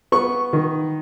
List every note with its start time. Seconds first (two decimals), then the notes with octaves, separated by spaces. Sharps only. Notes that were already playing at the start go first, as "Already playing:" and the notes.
0.12 B3 C#6
0.53 D#3